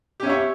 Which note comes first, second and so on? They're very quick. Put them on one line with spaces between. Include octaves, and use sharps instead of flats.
G4 C#4 E5 C#5